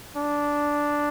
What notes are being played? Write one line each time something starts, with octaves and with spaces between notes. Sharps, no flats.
D4